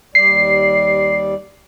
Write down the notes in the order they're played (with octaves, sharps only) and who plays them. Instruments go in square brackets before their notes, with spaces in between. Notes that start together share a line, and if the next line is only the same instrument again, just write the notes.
[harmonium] D#2 G3 D5 [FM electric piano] C7